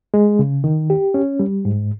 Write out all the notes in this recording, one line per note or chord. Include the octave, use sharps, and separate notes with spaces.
G#3
C#3
D#3
G4
C#4
G3
G#2